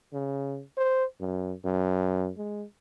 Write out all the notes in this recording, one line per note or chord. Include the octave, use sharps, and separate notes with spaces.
C#3
C5
F#2
F#2
G#3